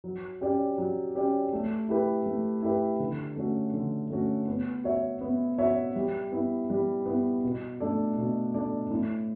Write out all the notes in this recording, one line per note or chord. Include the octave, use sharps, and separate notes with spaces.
F#3
C#4 G4 D5
F#3
C#4 G4 D5
A3
E4 G4 B4
A3
E4 G4 B4
D3
A3 C#4 F#4
D3
A3 C#4 F#4
B3
F#4 C#5 E5
B3
F#4 C#5 E5
G3
B3 E4
G3
B3 E4
B2
A3 D4 A4 D5
B2
A3 D4 A4 D5
A2